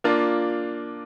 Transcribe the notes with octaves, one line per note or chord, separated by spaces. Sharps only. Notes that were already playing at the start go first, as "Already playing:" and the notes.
A#3 D4 F4